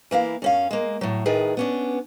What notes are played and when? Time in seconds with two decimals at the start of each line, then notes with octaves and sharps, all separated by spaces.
0.11 E3 A#3 E4 F5
0.42 F#2 C#4 F5
0.71 G#3 A#3
1.01 A2 F#3
1.26 A2 D#3 G#4 B4
1.57 B3 C#4 D4